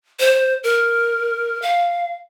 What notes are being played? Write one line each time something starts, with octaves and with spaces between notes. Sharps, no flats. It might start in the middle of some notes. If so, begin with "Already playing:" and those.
C5
A#4
F5